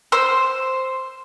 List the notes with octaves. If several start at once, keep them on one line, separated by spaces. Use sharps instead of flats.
C5 E6